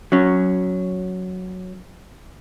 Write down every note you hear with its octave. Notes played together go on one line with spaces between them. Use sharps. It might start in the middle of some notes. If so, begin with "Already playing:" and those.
F#3 C#4